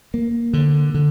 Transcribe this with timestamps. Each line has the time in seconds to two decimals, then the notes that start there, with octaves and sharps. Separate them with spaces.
0.14 A#3
0.53 D3
0.94 D3